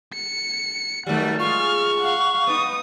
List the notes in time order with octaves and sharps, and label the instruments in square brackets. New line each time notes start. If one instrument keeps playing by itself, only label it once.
[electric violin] C#7
[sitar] D#3 F#3 G3 [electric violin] A3 F#5
[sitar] G#3 F4 [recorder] C#6 [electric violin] F6
[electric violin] F5 F#5
[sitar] B3 D#4 [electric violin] D#6